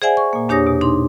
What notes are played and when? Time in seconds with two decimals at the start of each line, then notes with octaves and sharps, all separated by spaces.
0.02 G#4 C5 D5 E5 F#5 G#5
0.17 C#6
0.33 A#2 A#3
0.49 E2 D4 G4 C#5 D#6 A#6
0.67 B2
0.81 D4 D#4 C6